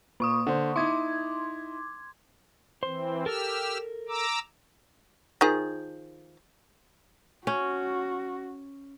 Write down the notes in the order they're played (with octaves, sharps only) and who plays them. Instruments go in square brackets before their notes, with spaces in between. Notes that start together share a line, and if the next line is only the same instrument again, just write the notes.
[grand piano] A#2 [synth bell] A#3 C#6 D#6
[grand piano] D3 C5
[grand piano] D#4 E4 [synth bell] C6 D6 G#6
[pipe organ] E3 C4 [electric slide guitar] C5
[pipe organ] G4 E6 F6 [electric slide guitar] A4 A#4
[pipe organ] A#5 D6 E6
[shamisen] D#3 F3 G#4
[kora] C#4 [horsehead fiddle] F#4